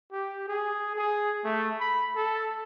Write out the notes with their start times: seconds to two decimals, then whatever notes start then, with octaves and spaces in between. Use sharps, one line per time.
0.12 G4
0.48 G#4
0.96 G#4
1.44 A3
1.80 B5
2.16 A4